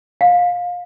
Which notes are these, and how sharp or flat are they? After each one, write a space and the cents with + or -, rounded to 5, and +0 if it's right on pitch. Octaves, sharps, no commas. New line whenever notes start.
F5 +25